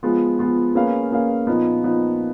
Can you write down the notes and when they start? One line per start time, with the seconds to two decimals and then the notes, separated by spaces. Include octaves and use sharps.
0.03 F3 G#3 B3 F4
0.39 F3 G#3 B3 F4
0.75 A#3 C#4 G#4 B4 F5
1.11 A#3 C#4 G#4 B4 F5
1.47 A#2 F3 B3 D#4
1.84 A#2 F3 B3 D#4